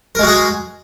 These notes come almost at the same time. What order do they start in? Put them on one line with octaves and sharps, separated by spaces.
A#4 G#3 F#4 G#4